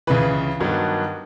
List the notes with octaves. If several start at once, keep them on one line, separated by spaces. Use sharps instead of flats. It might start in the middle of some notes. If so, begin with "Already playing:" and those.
C#2 C#3 E3 B4
G2 D#3 F#3 B3 D4